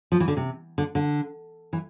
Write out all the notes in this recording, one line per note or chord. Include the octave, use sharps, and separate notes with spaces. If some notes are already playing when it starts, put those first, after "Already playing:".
F3
E3
D3
C3
D3
D3
E3